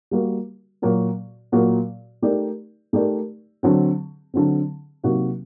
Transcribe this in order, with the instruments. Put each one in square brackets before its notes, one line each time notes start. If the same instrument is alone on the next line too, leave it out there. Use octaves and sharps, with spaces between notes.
[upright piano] G3 A#3 F#4
A#2 F#3 A#3 F#4
A#2 F#3 A#3 F#4
A3 D#4 G4 A#4 D5
A3 D#4 G4 A#4 D5
D3 F#3 C4
D3 F#3 C4
C3 F#3 A#3 D#4 F#4